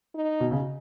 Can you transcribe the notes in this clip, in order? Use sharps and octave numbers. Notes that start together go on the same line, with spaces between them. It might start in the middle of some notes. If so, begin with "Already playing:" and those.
D#4
B2
C#3